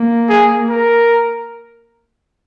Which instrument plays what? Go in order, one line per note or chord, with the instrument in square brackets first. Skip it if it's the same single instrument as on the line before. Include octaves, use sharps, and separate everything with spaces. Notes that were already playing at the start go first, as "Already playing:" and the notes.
Already playing: [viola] A#3
[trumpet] G#4
A#4